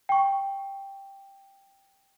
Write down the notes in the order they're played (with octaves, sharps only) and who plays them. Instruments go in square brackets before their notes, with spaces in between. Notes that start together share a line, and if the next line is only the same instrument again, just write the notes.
[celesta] G5 C#6